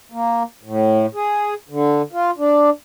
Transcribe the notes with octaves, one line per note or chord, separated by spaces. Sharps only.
A#3
A2
G#4
D3
F4
D4